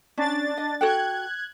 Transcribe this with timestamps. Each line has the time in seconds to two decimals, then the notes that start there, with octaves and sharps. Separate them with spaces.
0.18 C#4 D4 A6
0.57 D#5
0.81 F#4 A4 G5 F#6 G#6